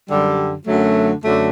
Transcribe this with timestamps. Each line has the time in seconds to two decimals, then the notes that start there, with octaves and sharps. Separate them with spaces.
0.09 F#2 D3 G3
0.66 F#2 D3 F#3 A3
1.24 F#2 D3 F#3 A3